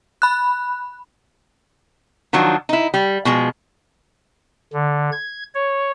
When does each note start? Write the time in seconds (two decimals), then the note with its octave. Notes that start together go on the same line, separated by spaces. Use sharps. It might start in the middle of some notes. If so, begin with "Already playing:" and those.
0.22 B5 F#6
2.33 D#3 F3 F#3 D4
2.69 D#4 E4
2.94 G3
3.25 B2 F3 G#3
4.73 D3
5.12 G#6
5.54 C#5